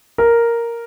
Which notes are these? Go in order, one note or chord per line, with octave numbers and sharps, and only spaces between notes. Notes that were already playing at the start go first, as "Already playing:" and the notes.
A#4